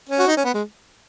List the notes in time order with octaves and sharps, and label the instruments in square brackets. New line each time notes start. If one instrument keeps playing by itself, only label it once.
[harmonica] C#4
F#4
D#4
C#4
B3
G#3